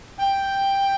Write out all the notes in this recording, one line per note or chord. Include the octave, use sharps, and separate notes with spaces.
G5